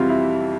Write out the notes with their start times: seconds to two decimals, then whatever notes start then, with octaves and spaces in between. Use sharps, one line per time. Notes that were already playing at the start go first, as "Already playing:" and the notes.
Already playing: F2 C3 E3 G3 F4 F#4
0.09 E4